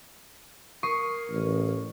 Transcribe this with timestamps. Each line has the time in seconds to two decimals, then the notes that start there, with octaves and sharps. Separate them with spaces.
0.83 A#4 C#6 D#6 C7
1.30 A1